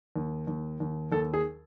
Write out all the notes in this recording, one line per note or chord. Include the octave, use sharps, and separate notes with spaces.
D#2
D#2
D#2
D#2 A4
G#4